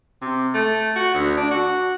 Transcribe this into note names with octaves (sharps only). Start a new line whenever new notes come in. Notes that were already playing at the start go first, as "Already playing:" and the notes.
C3
A3
F#4
D2
D4
F#4